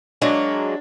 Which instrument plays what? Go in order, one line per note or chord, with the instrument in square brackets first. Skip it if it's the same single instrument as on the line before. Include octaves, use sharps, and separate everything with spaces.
[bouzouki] F#3 G#3 A#3 [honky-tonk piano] D4